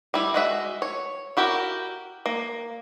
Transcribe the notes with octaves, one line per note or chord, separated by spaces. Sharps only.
G3 E4
G#3 F#4 E5
C#5
E4 F#4 G4 A#4
A#3